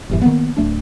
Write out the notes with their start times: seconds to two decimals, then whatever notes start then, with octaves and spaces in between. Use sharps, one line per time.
0.09 E1 G2 E3
0.22 D#3 F#3 A#3 B3
0.57 D1 A3 D4